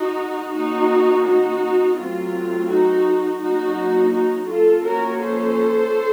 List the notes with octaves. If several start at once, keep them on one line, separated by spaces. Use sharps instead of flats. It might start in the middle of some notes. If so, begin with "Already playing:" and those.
Already playing: D#4 F#4
D#3 A#3 C#4 D#4 F#4
D#4 F#4
F#3 A3 C4 F4
D#4 F#4
F#3 A#3 C#4 D#4 F#4
D#4 F#4
F4 A4
F3 A#3 C#4 F#4 A#4
A4 C5